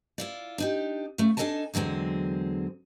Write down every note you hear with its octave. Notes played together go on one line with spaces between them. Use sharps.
E4 F4 D5
D4 D#4 G4
C#3 A3
D4 D#4 A4 D#5 G#5 A5
E2 D3 F#3 G#3 C4